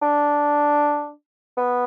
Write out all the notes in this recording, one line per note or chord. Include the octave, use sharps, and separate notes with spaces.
D4
B3